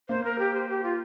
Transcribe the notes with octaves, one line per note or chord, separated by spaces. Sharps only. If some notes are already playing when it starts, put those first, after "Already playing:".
A#3 C5
A#4
G4
C5
G4
F4